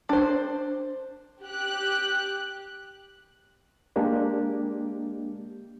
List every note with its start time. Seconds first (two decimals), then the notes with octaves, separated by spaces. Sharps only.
0.09 D4 C5
1.44 G4 F#6
3.96 G#3 A#3 D4 G4